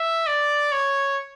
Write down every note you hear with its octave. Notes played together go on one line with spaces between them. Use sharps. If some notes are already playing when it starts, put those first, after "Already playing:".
Already playing: E5
D5
C#5